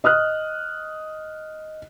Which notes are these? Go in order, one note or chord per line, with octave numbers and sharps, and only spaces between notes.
D#5 D#6 F6 F#6